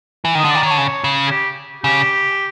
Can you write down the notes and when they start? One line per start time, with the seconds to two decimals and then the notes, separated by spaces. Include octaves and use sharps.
0.25 E3
0.35 D#3 D#5
0.45 D3
0.51 D#3 D5
0.63 D#3 C#5
0.71 D3
0.78 C#3
1.04 C#3
1.27 G#4
1.31 G4
1.84 C#3 G4